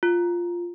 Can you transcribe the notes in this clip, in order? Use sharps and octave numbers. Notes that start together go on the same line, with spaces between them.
F4